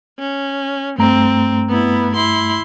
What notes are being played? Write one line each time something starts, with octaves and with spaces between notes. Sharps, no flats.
C#4
G2 A3 C4 A#5
B3 E4
E4 C6